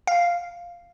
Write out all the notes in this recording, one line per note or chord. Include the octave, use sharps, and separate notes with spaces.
F5